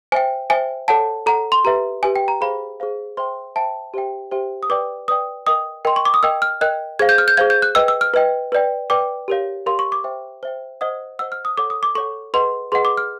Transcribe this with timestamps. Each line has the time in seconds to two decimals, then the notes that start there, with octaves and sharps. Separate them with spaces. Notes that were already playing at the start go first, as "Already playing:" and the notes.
0.12 C5 E5 G5 G#5
0.50 C5 E5 G5 G#5
0.88 A4 C#5 F#5 A5
1.26 A4 C#5 F#5 A#5
1.52 C6
1.64 G4 B4 E5 A#5
2.03 G4 B4 E5 G#5
2.16 G5
2.28 A#5
2.41 G#4 C5 F5 B5
2.80 G#4 C5 F5
3.17 C5 E5 G5 C6
3.56 C5 E5 G5 A5
3.94 G4 C5 E5 G5
4.31 G4 C5 E5 G5
4.63 D#6
4.70 B4 D5 G5 D6
5.08 B4 D5 G5 D#6
5.47 A#4 D#5 G5 D#6
5.85 A#4 D#5 G5 C6
5.96 C#6
6.05 D6
6.14 D#6
6.23 A#4 D#5 G5 E6
6.42 F6
6.61 A#4 D#5 G5 F#6
6.99 G#4 C5 F5 G#6
7.09 G6
7.18 F6
7.28 G6
7.37 G#4 C5 F5 G#6
7.50 G6
7.62 F#6
7.75 B4 D#5 G5 E6
7.88 E6
8.01 F6
8.14 B4 D#5 G5
8.52 B4 D5 G5
8.90 B4 D5 G5 D6
9.28 G4 A#4 C#5 F5
9.66 G4 A#4 C#5 F5 C6
9.79 C#6
9.92 D6
10.04 C5 E5 G5
10.43 C5 E5 G5
10.81 C5 D#5 F#5 D#6
11.19 C5 D#5 F#5 E6
11.32 F6
11.45 D#6
11.58 A4 C#5 F#5 D6
11.70 D#6
11.83 D6
11.95 A4 C#5 F#5 C#6
12.34 G#4 B4 D#5 F#5 C6
12.72 G#4 B4 D#5 F#5 C6
12.85 D6
12.97 F6